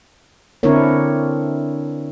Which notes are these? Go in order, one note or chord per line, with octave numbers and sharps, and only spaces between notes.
D3 C4 D4 E4 A#4 C#5